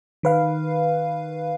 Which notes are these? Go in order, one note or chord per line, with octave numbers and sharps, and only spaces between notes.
D#3 B4 F5